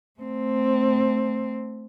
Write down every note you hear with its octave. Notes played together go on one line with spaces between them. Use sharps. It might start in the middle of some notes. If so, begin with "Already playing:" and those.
A3 C4